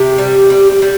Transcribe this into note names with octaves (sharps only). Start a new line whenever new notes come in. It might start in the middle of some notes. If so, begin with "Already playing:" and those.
Already playing: C3 G4
G3
G3
G3